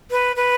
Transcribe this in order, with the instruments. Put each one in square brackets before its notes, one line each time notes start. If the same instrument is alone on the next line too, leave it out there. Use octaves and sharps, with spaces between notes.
[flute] B4
B4